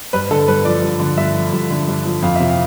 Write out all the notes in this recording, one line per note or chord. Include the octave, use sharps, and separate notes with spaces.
G2 B4
D3 A4
G2 B4
F3 D5
G2
D3
G2 E5
F3
G2
D3
G2
F3
F2 F5
C3 E5
F5